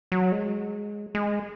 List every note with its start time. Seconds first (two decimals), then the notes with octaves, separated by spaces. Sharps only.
0.12 F#3
0.32 G#3
1.15 G#3